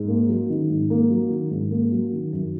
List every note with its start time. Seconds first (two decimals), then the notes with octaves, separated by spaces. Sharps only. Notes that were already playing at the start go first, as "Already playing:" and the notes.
Already playing: G#2
0.08 A#3
0.29 F#3
0.50 D#3
0.70 G#2
0.90 A#3
1.10 F#3
1.30 D#3
1.51 G#2
1.71 A#3
1.92 F#3
2.13 D#3
2.33 F#2